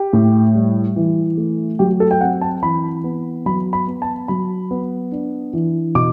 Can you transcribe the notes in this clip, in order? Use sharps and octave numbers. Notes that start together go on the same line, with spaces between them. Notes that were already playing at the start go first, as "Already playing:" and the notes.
Already playing: G4
A2
G3
E3
A3
F#3 G4
A4
G5
C4 F#5
A5
E3 B5
B3
F#3 B5
B5
B3
A5
F#3 B5
B3
D4
E3
B2 D6